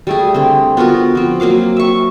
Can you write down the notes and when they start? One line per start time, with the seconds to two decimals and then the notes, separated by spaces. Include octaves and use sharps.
0.07 G3 A3 G#4
0.34 D3 C4
0.77 B3 F4 F#4 A#4
1.15 F3 C4
1.40 F#3 A#3 F5 D6
1.76 E5 C#6